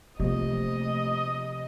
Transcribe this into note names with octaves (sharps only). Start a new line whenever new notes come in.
C3 F3 A3 A#3 D#5